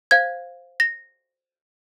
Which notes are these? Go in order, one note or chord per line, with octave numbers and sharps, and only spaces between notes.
C5 F5 G#6
A#6